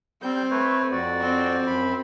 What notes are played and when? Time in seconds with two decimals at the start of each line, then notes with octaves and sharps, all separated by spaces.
0.22 G3 C4 G6
0.51 A3 B4 C#5
0.92 F2 F#4 D5
1.21 C4
1.67 F#2 B5